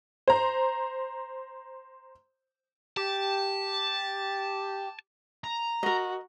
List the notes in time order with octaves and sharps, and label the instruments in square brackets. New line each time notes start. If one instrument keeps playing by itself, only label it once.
[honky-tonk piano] C5 A#5
[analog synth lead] G4 [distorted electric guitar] A5
[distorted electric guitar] A#5
[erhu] F#4 [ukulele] A#4 D#5